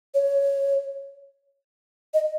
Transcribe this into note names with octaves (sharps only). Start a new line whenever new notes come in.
C#5
D#5